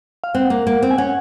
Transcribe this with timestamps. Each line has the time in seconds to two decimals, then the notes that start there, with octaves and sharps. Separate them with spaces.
0.24 F5
0.34 C4 F#5
0.50 A#3
0.67 A#3
0.83 C4
0.91 G#5
0.98 C#4 F#5